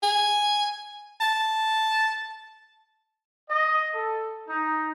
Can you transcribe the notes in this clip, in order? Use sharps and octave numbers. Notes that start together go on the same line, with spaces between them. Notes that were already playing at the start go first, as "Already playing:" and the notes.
G#5
A5
D#5
A4
D#4